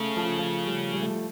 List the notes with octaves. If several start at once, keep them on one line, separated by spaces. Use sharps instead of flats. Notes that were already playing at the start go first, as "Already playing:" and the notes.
Already playing: C#3 A3
F3
F3
G3
G3
A3
G3